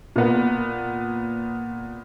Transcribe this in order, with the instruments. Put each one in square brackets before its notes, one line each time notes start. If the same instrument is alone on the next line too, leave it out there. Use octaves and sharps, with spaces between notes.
[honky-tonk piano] A#2 B3